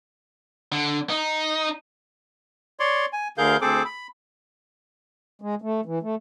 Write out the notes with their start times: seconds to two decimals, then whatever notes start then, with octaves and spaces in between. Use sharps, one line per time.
0.72 D3
1.10 D#4
2.80 C#5 D5 C6
3.13 G#5
3.38 D2 D3 G#4 A#4 F5 G6
3.61 D2 C4 G#4 A4 C5 D6
3.85 B5
5.42 G#3
5.62 A3
5.86 E3
6.02 A3